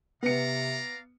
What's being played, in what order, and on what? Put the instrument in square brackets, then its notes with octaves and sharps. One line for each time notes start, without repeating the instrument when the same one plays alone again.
[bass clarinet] C3 [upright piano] B3 C#7 [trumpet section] D5 F5 A#5